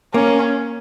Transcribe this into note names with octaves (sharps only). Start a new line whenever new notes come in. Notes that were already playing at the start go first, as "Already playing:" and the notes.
A#3 C#4